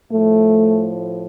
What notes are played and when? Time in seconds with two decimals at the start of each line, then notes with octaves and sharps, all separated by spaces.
0.12 A2 F3 A3